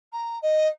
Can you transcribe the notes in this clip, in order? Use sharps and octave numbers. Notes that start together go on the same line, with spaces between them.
A#5
D#5